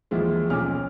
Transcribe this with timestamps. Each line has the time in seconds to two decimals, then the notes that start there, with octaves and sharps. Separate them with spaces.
0.11 D#2 E3 F3 G#3
0.50 B1 F3 C#4 G#5 D6 F6